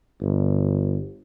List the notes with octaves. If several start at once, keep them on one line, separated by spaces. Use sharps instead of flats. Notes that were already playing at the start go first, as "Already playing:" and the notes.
G1